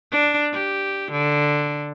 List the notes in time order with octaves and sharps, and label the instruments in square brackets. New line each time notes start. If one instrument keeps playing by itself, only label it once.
[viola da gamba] D4
G4
D3